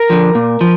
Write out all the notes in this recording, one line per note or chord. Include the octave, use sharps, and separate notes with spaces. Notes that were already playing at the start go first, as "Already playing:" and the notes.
Already playing: A#4
D3 F3
A#2
F3